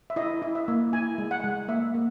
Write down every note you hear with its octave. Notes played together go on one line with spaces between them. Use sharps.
E5
E4 D#5
E4
E5
A#3
E4 G#5
G#3
F#5
G#3
A#3 E5
A#3